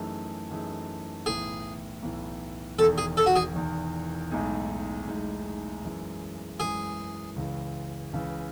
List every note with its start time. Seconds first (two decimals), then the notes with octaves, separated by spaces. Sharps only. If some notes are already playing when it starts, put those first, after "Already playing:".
Already playing: F#2 E3 A3 D#4 G#4
0.50 F#2 E3 A3 D#4 G#4
1.26 B1 A2 E3 G#4
2.02 B1 A2 E3
2.79 E1 E2 D#3 A4
2.98 G#4
3.17 A4
3.26 F#4
3.36 G#4
3.55 E1 E2 D#3
4.31 B1 A2 G#3 D#4 G#4
5.08 B1 A2 G#3 D#4 G#4
5.84 F#2 E3 G#3
6.59 F#2 E3 G#3 G#4
7.36 C#2 C#3 E3
8.13 C#2 C#3 E3